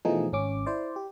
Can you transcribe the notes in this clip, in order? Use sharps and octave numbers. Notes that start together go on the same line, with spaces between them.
B2 E3 F3 A3 D#4 G#4
G#1 C#4 D6
E4 C5 D5
G4